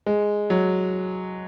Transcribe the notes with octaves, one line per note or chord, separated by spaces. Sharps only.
G#3
F#3